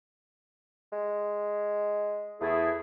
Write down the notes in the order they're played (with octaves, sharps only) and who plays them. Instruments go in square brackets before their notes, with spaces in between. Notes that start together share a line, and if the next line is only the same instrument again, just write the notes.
[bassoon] G#3
[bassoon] E2 [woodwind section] A3 E4 G#4